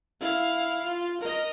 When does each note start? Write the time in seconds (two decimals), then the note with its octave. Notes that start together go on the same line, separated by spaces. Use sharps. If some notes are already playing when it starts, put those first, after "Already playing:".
0.21 E4 F5
0.85 F4
1.21 A#4 D#5